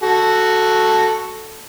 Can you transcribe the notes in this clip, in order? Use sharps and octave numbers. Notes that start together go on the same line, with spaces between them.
F#4 A4